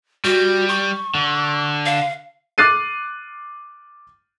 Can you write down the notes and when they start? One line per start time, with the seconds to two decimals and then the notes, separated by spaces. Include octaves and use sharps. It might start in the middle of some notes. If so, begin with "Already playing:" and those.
0.25 G3 F#4
0.69 C#6
1.15 D3
1.86 F5
2.58 D6 F6 F#6 A6 C7 D#7